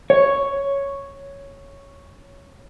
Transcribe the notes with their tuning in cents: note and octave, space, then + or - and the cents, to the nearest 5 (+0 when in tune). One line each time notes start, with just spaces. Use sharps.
C#5 +0